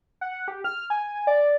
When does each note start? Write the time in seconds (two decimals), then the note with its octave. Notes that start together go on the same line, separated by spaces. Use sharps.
0.21 F#5
0.48 G4
0.64 F6
0.90 G#5
1.27 D5